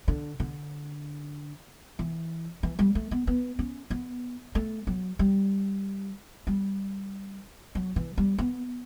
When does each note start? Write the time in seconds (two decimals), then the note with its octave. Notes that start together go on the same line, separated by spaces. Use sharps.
0.08 D3
0.40 D3
1.99 E3
2.63 E3
2.79 G3
2.95 A3
3.11 B3
3.27 B3
3.59 C#4
3.90 B3
4.55 A3
4.87 F#3
5.19 G3
6.47 G3
7.75 F#3
7.96 E3
8.18 G3
8.38 B3